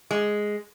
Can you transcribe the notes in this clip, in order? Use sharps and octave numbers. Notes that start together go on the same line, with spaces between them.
G#3